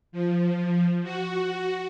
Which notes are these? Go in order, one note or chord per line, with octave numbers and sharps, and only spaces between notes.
F3
F#4